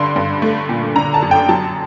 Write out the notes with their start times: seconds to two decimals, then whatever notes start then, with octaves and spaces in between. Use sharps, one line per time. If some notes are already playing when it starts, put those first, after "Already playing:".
Already playing: G2 D3 C6
0.16 G2
0.42 A3
0.69 A#2
0.96 D3 A#5
1.14 A5
1.22 F#2
1.31 G5
1.49 F#3 A5